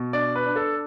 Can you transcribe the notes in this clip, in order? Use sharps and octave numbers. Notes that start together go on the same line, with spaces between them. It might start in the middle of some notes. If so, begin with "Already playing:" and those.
Already playing: B2
D4 D5
B4
D4
A4